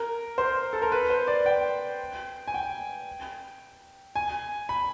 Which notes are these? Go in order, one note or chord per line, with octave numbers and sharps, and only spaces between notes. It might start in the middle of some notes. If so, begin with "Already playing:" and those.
Already playing: A#4
C5
A4
A#4
B4
C5
D5
G5
G#5
G5
G#5
B5